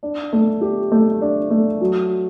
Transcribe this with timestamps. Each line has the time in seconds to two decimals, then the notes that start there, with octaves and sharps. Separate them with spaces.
0.03 D4
0.33 A3
0.61 G4
0.92 A3
1.21 D4
1.50 A3
1.81 F#3